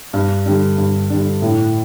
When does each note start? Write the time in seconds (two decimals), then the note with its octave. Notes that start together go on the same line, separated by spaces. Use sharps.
0.13 G2
0.45 D3 G3 D4
0.78 G2
1.10 D3 G3 D4
1.42 A2